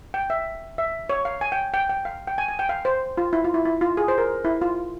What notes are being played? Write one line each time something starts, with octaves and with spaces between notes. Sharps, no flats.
G5
E5
E5
C#5
F5
G#5
G5
G5
G5
F5
G5
G#5
G#5
G5
F5
C5
F4
E4
F4
E4
E4
F4
G#4
C5
A#4
E4
F4